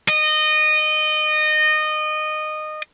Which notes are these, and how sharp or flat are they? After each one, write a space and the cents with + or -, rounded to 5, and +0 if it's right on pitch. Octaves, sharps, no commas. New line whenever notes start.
D#5 -20